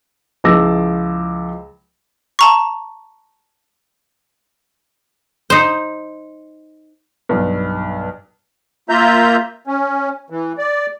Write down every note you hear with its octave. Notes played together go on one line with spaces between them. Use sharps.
C#2 F3 E4 D6 E6 A#6
A5 A#5 C#6
D#4 C5
B1 G2
A#3 F4 E5 A#5 G6
C#4
E3
D5